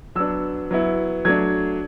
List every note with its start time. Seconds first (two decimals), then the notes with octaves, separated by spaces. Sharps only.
0.15 F#3 B3 D4 E6
0.71 F#3 B3 E4
1.25 F#3 A3 D4 G#6